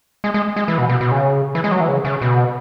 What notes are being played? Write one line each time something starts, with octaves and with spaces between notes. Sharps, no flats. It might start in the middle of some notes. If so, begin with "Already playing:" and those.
G#3
G#3
G#3
E3
B2
B2
B2
C#3
E3
G#3
F#3
E3
C#3
C#3
B2